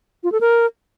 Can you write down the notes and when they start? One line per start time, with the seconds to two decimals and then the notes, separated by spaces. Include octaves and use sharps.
0.24 F4
0.32 A4
0.41 A#4